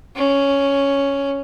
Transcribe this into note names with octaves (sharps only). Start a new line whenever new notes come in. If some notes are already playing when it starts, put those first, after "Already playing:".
C#4